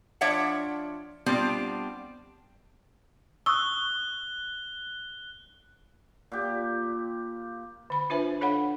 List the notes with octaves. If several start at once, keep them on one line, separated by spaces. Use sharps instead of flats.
F3 D4 C#5 E5 F#5
G3 B3 C4 D4 F4 C5
C#6 D#6 E6 F#6 G7
A#2 G4
D3 B5
D4 F4 B4 C5 E5 G#5
D4 A4 C#5 F5 F#5 B5